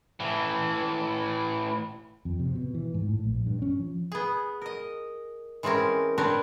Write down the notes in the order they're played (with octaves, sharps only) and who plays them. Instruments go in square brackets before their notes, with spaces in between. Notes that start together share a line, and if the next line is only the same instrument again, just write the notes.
[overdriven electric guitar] A2 E3
[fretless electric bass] F2
C3
B2
E3
G#2
A2
A#1
G2
C#4
F3
[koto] B3 G#4
A#4 D#5
E3 G#3 C4 C#4 A#4
C4 D4 A#4 B4 C#5